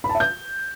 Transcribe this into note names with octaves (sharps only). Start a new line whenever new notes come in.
B5
A5
E5
G6